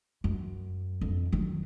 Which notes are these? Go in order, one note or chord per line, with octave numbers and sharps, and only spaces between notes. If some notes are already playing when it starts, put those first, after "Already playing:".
F#2
F2
D#3 F#3